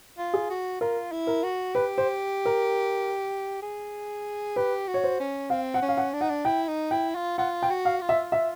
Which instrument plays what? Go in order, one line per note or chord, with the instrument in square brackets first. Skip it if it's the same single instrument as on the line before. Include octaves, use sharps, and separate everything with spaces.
[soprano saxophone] F4
[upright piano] G#4
[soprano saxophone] F#4
[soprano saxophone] F4 [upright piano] A#4
[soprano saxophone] E4
[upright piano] A#4
[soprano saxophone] F#4
[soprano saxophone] G4 [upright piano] B4
[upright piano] C5
A#4
[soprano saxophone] G#4
[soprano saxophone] G4 [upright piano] B4
[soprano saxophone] F#4
[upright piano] C#5
C5
[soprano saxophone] C#4
[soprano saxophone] C4 [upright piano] F5
[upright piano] F#5
[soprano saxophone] C#4
[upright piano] F5
F#5
[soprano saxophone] D4
[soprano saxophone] D#4 [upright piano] F#5
[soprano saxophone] D4
[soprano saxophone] E4 [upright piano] G5
[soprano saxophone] D#4
[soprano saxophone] E4 [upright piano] G5
[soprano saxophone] F4
[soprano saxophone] F4 [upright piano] F#5
[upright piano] G5
[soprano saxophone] F#4
[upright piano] F5
[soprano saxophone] F4
[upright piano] E5
E5